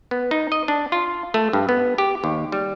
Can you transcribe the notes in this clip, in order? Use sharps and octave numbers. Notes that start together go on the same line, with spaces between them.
B3
D#4
D#5
D4
F4
A3
G2
B3
G4
D#2
G3